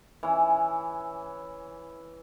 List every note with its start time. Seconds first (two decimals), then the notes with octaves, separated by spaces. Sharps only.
0.23 E3 C#4